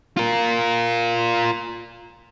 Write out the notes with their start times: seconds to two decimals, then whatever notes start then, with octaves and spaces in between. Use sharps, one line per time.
0.17 F4 A#4